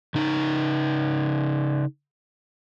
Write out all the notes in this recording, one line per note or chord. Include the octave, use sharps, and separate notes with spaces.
C#3 D#4